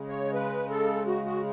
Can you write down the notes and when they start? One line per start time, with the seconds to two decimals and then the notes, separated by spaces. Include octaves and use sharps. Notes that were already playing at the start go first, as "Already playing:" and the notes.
Already playing: C#3 G#3
0.09 C#5
0.34 B4
0.70 A4
1.07 F#4
1.26 F#4